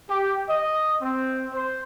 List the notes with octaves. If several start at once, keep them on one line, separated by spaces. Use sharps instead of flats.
G4
D#5
C4
C5